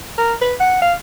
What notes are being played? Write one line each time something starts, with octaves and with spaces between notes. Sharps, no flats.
A#4
B4
F#5
F5